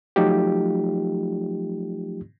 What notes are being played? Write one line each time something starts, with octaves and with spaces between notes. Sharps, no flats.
F3 F#3 A3 D#4 F4 G4